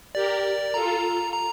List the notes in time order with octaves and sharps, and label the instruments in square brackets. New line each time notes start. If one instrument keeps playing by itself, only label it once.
[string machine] G4 A#4 [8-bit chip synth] D5
[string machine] F4 A4 [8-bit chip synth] A#5
[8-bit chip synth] A#5